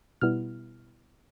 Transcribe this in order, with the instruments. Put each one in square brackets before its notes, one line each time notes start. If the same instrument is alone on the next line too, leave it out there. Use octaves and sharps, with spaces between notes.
[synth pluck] B2 G3 B3 E4 F6